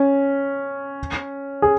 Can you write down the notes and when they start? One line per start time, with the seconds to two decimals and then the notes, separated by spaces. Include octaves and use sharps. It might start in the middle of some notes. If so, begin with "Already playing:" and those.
Already playing: C#4
1.62 G#4